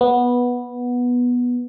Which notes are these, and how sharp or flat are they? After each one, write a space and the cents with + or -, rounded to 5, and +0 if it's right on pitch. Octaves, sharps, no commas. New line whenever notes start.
B3 -10